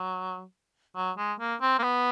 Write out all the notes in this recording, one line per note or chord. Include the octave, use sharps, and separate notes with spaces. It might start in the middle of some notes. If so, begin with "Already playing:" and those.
Already playing: F#3
F#3
G#3
A#3
C4
A#3
B3